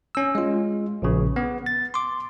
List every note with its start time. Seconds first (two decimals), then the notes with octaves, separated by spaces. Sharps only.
0.15 C#4 E6
0.35 G#3 F4
1.02 A#1 C#3
1.36 B3
1.66 A6
1.94 C6 D6